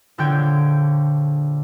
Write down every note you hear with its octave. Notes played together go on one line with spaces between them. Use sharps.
A#1 D3 C#5 G5 G6 G#6